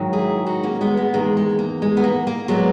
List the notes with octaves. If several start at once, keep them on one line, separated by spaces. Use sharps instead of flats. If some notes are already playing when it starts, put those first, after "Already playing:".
Already playing: G#2 D#3 F#3
E4 G#4
D#4 F#4
A#3 C#4
G#3 B3
G#3 B3
E2 D#3 G#3 A#3
G#3
A#3
G#3
B3
A#3
A#3
A#2 F#3 G#3 B3